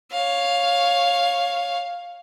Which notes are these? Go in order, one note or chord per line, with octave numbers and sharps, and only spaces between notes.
C#5 F5